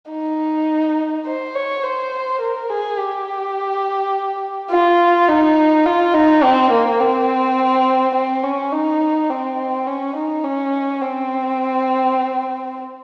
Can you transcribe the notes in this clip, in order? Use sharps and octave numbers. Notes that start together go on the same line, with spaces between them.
D#4
C5
C#5
C5
A#4
G#4
G4
F4
D#4
F4
D#4
C4
A#3
C4
C4
C#4
D#4
C4
C#4
D#4
C#4
C4